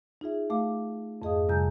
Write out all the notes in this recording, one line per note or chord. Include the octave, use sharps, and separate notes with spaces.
D#4 F4 G#4 E5
A3 F5 D6
F2 G#2 G#4 D#5 F5 D#6
F2 C3 G3 G#5 A#5 G6